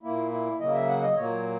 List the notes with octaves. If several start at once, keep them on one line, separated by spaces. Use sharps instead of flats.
A#2 A#3 E4
E4
C#3 F#3 A#3 D#5
E5
F#5
D#5
A#2 F#3 A#3 C#5